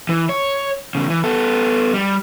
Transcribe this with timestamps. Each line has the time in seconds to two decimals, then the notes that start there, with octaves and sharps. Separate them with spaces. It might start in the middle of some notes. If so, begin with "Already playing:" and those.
0.09 E3
0.29 C#5
0.95 E2 C#3
1.09 E3
1.24 B3 A4
1.94 G3